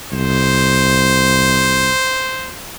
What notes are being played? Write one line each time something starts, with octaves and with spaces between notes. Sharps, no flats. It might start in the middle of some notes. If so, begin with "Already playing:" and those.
C2 C5